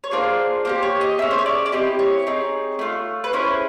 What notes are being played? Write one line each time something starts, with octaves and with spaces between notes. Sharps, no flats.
C#5
A#3 D4 F4 G#4 C5
A#3 D4 G4 C5
C#5
D#5
C#4 E4 G#4 E5
C5
C#5
D5
D5
C4 E4 G4 D#5
C#5
C4 D#4 G#4
A3 D4 F4
B4
C#4 E4 G#4 C5